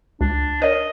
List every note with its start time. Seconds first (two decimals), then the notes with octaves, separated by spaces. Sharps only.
0.21 C#2 D4
0.62 A#4 C#5 D#5